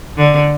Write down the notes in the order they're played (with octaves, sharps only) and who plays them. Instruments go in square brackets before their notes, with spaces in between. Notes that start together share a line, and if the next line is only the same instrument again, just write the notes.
[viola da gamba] D3